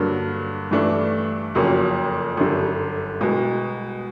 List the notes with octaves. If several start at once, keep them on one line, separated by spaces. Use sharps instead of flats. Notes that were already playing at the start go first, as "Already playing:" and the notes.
Already playing: G2 D3 F#3 A#3
G2 E3 A3 D4
F#1 F2 C#3 F#3 A#3
G1 F#2 D3 G3
C2 B2 G#3